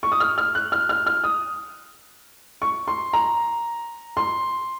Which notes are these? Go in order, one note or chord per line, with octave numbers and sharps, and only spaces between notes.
C#6
D#6
F6
F6
F#6
F6
F6
F6
D#6
C#6
C6
A#5
C6